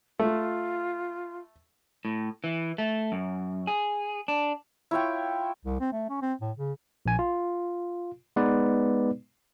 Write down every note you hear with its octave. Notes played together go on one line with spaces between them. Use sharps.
A3 F4
A2
E3
A3
F#2
G#4
D4
E4 F4 C#5 G5
C2
C4
A3
C#4
C4
A2
C#3
A#1 G#5
F4
G#3 B3 D#4 B4 D5